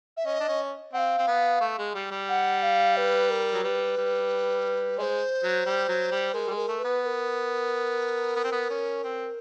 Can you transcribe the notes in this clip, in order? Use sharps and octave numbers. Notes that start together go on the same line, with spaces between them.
E5
C#4 D#5
D4
C#4
C4 F5 F#5
C4
B3
A3
G#3
G3
G3
F#5
F5
B4
A#4
F#3
G3 B4
G3
G#3 C5 D#5
F#3
G3
F#3
G3
G#3 A#4
G3
G#3
A#4
A3
B4
B3
B4
A#4
B3
C4
B3
C#4
C4